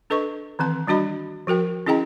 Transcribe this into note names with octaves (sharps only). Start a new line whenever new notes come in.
D4 A4 B4 D#5 C#6
D#3 E3 C4 A5
G3 D4 F#4 D#5 B5
F3 F#4 A#4 G5
C#4 E4 G#4 D#5 G5 A#5